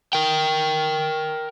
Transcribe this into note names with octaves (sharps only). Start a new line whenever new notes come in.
A#4 G5